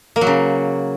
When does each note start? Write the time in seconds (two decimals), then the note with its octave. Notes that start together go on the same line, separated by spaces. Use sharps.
0.16 A#3
0.21 F#3
0.27 C#3